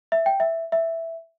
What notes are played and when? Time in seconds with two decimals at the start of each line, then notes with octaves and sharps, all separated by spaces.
0.12 E5
0.26 G5
0.40 E5
0.72 E5